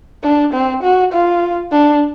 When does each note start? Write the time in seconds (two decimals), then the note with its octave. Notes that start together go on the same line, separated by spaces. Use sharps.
0.23 D4
0.53 C4
0.83 F#4
1.12 F4
1.72 D4